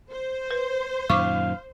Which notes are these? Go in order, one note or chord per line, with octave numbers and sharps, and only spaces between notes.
C5
B4
F#2 A#2 D#3 F5 C#6 D6